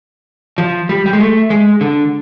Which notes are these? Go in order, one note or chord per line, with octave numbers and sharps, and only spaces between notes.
F3
G3
G3
G#3
A3
G#3
D3